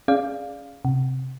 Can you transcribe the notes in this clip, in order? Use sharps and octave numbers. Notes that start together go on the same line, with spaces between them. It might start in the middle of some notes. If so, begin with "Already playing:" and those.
C#4 G#4 D5 F5
C3